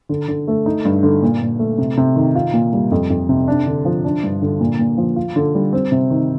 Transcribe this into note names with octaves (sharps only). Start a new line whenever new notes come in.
D3
D3
A3
D#4
G2
D3
A#2
A#2
A3
C3
C3
D#3
F4
A#2
G3
F2
F2
C3
D4
D3
F3
D4
G2
D3
A#2
A#2
F3
F4
D3
G3
C4
C3
D#3